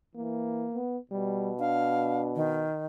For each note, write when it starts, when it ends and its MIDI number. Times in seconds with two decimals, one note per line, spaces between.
0.15 0.67 52
0.15 0.79 58
0.75 0.98 59
1.11 2.68 47
1.11 1.51 55
1.60 2.49 62
1.60 2.22 77
2.36 2.86 51